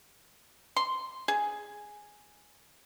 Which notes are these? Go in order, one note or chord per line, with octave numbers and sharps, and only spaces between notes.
C6
G#4